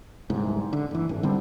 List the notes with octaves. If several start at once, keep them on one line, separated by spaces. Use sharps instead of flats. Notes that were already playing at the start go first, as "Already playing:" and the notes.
D1 C2 G#2
D3
F#1 E3
G#1
D3 G3 C4